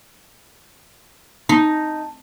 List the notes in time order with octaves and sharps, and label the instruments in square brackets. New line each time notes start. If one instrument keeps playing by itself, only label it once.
[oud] D#4 [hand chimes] A5